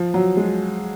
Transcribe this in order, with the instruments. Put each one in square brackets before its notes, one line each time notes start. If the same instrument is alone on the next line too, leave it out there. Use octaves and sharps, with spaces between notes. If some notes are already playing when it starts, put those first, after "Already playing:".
Already playing: [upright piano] F3
F#3
G#3